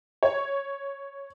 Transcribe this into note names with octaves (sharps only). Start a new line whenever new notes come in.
C#5